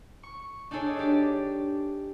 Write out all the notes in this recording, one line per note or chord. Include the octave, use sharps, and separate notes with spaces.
C#6
D4 D#4 G#4 A4 C#5 D5
D4 G4 D5